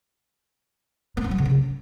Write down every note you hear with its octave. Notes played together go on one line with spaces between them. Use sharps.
A#3
C#4
F#3
C#3
C#4